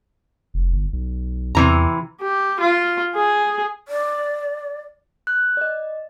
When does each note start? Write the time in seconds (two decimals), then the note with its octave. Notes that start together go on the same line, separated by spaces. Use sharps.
0.54 F1
0.73 G1
0.93 B1
1.55 E2 C3 E3 A#5
2.22 G4
2.60 F4
3.15 G#4
3.88 D5
5.27 F#6
5.57 D5 D#5